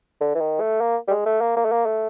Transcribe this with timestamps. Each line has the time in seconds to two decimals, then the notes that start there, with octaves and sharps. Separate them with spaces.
0.21 D3
0.35 E3
0.41 D#3
0.61 A3
0.81 A#3
1.08 G3
1.11 G#3
1.26 A3
1.41 A#3
1.57 A#3
1.65 A3
1.72 A#3
1.86 A3